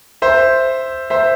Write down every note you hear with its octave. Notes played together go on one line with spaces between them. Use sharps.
C5 E5
C5 E5